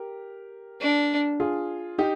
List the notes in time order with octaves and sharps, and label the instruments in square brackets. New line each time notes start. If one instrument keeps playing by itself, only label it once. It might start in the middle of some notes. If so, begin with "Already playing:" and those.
Already playing: [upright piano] G4 A#4
[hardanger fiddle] D4
[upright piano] F4 G#4
D#4 G4